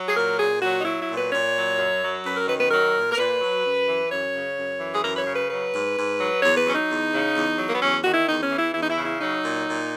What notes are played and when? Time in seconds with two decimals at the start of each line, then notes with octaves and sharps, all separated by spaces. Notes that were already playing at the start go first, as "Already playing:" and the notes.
Already playing: F#3
0.09 G#4
0.16 A#2 A#4
0.39 A#2 G#4
0.62 F#3 F#4
0.81 D#4
0.85 F#3 E4
1.01 E4
1.09 A#2
1.17 B4
1.32 A#2 C#5
1.56 F#3
1.78 F#2
2.01 F#3
2.24 F#2 B4
2.36 A#4
2.48 D#3 B4
2.60 B4
2.71 F#3 A#4
2.95 A#2
3.11 A#4
3.17 A#2 B4
3.41 F#3
3.64 F#2
3.88 E3
4.10 F#2 C#5
4.34 C#3
4.57 F#2
4.80 E3
4.93 G#4
5.03 F#2 A#4
5.14 B4
5.18 C#5
5.27 C#3
5.34 B4
5.49 F#3 B4
5.73 G#2
5.96 G#2
6.19 F#3
6.42 E2 C#5
6.57 B4
6.66 F#3 C#4
6.73 D#4
6.89 E2
7.12 C#3
7.35 E2
7.58 F#3
7.67 A#3
7.74 B3
7.81 E2 C#4
8.03 D#3 F#4
8.13 E4
8.28 E2 D#4
8.43 C#4
8.51 E3
8.59 E4
8.74 E2 E4
8.83 D#4
8.89 E4
8.97 C#3
9.05 E4
9.21 F#3 D#4
9.43 A#2
9.67 A#2